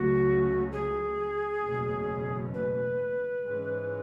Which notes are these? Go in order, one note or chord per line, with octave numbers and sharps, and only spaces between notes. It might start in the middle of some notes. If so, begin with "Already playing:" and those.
Already playing: C#2 C#3 F#3 A3 C#4 F#4
G#4
F#1 E2 B2 A3 C#4
B4
G#2 E3 G#3 C#4